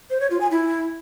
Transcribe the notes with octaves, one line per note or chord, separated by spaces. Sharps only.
C5
C#5
F4
G#5
E4